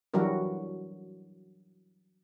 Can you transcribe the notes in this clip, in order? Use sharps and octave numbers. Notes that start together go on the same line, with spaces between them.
E3 F#3 G3 D4 F#4 A#4